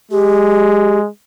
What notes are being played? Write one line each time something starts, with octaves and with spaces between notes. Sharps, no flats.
G#3 G4